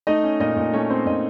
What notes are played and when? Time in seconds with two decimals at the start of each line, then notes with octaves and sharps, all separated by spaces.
0.07 A3 D#4 D#5
0.23 C#4
0.40 A#2 D#4 D#5
0.57 A#2
0.73 A3 C#4 C#5
0.90 C4 C#4 C5
1.06 A#2 D#4 D#5